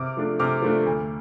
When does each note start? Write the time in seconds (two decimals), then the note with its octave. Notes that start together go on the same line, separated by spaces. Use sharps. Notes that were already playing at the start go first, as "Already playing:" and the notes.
Already playing: C3 D6 F6
0.17 F3 A3 D4
0.39 C3 D6 F6
0.62 F3 A3 D4
0.86 D2